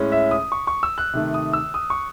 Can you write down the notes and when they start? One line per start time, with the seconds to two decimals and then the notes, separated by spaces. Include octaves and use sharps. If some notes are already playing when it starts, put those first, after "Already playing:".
Already playing: A2 G#3 C#4
0.12 E5
0.31 D#6
0.52 C#6
0.67 C#6
0.83 E6
0.98 F#6
1.13 C3 D#3 A3
1.34 D#6
1.53 E6
1.74 D#6
1.90 C#6